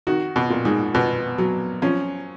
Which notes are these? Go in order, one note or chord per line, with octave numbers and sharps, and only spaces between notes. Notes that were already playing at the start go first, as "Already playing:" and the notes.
D#3 F#4
B2
A#2
G#2
B2 B3
F#3
F3 C#4